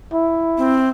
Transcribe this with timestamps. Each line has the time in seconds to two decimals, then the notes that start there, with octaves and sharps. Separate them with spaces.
0.13 E4
0.58 C4